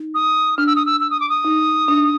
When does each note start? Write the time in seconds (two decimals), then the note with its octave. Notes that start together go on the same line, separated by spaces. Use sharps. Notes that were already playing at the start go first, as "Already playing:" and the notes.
Already playing: D#4
0.14 D#6
0.58 D4 F6
0.67 E6
0.76 D#6
0.86 E6
1.01 E6
1.10 D#6
1.20 D6
1.29 D#6
1.45 D#4
1.88 D4